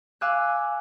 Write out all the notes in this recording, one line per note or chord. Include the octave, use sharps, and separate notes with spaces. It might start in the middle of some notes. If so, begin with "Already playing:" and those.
F5 G#5 D6 E6 F#6